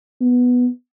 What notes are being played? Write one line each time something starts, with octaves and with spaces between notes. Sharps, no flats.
B3